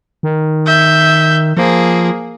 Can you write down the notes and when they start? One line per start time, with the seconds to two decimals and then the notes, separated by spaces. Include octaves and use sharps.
0.23 D#3
0.66 E5 G6
1.57 F3 A#3 G#4